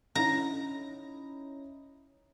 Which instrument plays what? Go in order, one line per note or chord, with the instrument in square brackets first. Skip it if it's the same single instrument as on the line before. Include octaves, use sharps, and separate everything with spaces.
[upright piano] C#4 D#4 E4 [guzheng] A#5